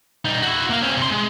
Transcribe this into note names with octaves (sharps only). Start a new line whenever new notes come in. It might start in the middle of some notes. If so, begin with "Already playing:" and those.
G3 D#4
E4 F#4
A#3 F5
C4 C#4
C3 C6
G#3